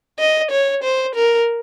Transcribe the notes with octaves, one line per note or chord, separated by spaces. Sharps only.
D#5
C#5
C5
A#4